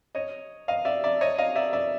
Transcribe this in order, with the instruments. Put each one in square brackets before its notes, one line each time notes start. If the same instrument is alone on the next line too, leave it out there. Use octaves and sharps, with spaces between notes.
[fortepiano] C#5 D#5
D#5 F5
D5 E5
D5 E5
C#5 D#5
D#5 F5
D5 E5
D5 E5